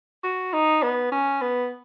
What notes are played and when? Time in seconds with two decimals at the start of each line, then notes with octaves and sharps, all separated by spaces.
0.24 F#4
0.53 D#4
0.83 B3
1.12 C#4
1.41 B3